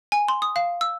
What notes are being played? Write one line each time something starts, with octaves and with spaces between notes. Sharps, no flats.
G#5
C6
D#6
F5
E6